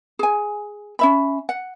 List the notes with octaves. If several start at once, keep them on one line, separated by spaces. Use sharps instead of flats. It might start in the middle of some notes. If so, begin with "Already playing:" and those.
G#4 G#5
C#4 E5 B5
F#5